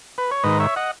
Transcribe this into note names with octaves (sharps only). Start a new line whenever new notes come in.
B4
C#5
G#2 D#3 B4 D#5
C#5 E5
D#5 F#5